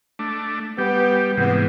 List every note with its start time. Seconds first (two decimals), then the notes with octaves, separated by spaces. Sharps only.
0.19 A3 D4
0.78 G3 B3 G4
1.38 G#2 C3 E3 B3